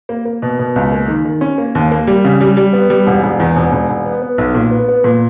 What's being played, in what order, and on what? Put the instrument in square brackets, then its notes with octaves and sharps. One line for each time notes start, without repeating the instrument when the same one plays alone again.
[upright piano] A#3
A#3
B2
B2
C#2
A#3
D#3
D#3
C#4
A#3
D#2
A#3
G3
C#3
G3
G3
B3
G3
E1
E1
E2
E1
E1
E1
B3
B3
B1
A#2
B3
B3
A#2